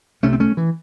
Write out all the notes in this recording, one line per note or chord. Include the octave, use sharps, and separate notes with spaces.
C2 C3 A3 C#4
C4
A3 C#4
E3